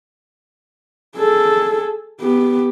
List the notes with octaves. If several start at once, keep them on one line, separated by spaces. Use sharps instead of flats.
G#4 A4
B3 G4